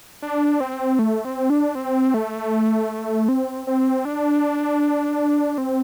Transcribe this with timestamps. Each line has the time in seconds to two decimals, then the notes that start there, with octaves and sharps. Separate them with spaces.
0.22 D4
0.60 C4
0.99 A3
1.25 C4
1.50 D4
1.75 C4
2.14 A3
3.29 C4
3.67 C4
4.05 D4
5.58 C4